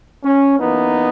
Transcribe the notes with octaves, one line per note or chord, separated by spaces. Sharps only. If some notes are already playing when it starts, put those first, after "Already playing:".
C#4
F#2 E3 A#3 B3 D#4